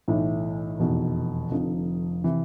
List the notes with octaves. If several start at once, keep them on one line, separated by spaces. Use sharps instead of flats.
B1 A2 E3
F1 E2 B2
F1 F2 D3 F3
C3 E3